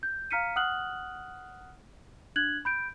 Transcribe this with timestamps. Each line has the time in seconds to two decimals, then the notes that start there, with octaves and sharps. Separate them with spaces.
0.03 G6
0.31 F5 A#5 F6 B6 C#7 D#7
0.56 F#5 D#6 F6 F#6 F#7
2.36 D4 F#6 G#6 F#7
2.65 B5 G6 D7